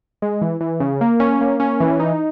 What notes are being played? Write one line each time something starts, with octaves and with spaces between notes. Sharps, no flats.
G#3
E3
E3
C#3
A#3
C#4
A#3
C#4
E3
D#4